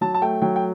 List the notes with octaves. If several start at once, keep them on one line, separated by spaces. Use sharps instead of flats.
F#3 A5
A5
A3 G5
F#3 G5
G5